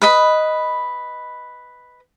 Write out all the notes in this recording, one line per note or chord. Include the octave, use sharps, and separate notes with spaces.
B4 D#5 B5